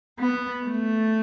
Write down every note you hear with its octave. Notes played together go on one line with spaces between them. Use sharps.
B3
A3